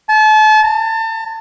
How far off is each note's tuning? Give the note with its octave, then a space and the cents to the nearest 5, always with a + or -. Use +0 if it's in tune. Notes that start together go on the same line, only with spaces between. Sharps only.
A5 -35
A5 +35